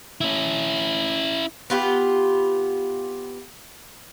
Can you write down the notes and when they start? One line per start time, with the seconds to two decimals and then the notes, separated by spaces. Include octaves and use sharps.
0.21 C#4 E4
1.70 B3 F4 G4